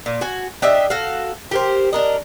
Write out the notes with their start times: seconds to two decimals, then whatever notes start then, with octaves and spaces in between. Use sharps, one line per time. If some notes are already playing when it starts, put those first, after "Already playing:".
0.06 A#2
0.21 F#4 G#5
0.62 D4 G4 D#5 E5
0.90 F#4 A4 F5
1.51 G4 A#4 C5
1.93 D4 A#4 D#5